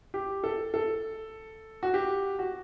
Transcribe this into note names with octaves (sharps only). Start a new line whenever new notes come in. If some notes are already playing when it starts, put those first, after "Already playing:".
G4
A4
A4
F#4
G4
F#4